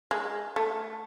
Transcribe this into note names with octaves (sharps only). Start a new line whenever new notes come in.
G#3
A3